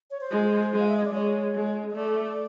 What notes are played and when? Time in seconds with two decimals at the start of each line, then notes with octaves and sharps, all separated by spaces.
0.11 C#5
0.21 C5
0.31 G#3
0.73 G#3
0.80 F5
0.88 E5
0.97 D#5
1.05 D5
1.13 G#3 C#5
1.55 G#3
1.90 D#5
1.95 A3 D5